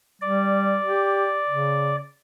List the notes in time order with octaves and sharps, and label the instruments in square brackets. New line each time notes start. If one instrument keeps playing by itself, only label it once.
[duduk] G3 [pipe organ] D5
[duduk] G4
C#3